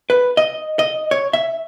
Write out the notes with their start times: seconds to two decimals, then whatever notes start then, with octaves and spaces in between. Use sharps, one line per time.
0.10 B4
0.37 D#5
0.79 D#5
1.11 C#5
1.33 E5